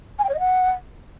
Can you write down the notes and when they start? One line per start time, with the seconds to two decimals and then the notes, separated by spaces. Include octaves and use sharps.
0.19 G#5
0.24 G5
0.29 C#5
0.34 D#5
0.39 F#5